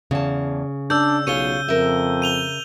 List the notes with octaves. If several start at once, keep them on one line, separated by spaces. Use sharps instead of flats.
E2 C#3 A5
D4 D5 E6 G6
B1 F4 G#4 C#5 D#7 G7
F2 A#4 E5
D#7 F7 G7